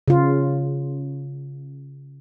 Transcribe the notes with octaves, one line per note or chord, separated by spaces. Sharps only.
C#3 F4